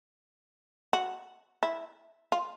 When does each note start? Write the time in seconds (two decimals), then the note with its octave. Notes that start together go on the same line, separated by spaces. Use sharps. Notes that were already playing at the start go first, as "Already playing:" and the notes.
0.93 F#4
1.63 E4
2.32 F4